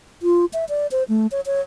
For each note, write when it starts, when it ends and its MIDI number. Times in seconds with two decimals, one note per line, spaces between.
0.23 0.45 65
0.53 0.65 76
0.69 0.87 74
0.92 1.04 72
1.09 1.27 57
1.32 1.41 73
1.46 1.61 73